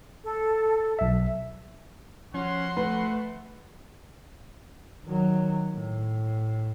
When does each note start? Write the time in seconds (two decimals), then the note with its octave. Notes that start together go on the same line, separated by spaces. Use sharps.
0.24 A4
0.99 B1 E5
2.34 F3 C#4 F#4 F#5 C6
2.77 A3 B4
5.05 D#3 F#3
5.75 A2